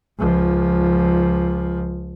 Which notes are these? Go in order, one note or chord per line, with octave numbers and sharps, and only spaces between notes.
C#2 F3